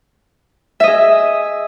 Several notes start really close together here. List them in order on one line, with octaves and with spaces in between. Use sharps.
E5 D#5 G#4